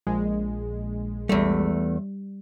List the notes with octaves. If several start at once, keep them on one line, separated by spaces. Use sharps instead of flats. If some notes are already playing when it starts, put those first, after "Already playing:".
A#1 G#3
E2 G3 A3